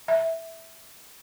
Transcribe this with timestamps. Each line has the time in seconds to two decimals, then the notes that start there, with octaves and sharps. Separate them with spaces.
0.08 E5